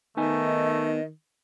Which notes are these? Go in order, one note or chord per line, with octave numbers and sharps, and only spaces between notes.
D#3 A3 B3 D#4 D#5 G#5